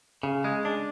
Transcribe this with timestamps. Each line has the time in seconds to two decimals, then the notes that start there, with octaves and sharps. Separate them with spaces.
0.23 C#3
0.44 G#3
0.65 D4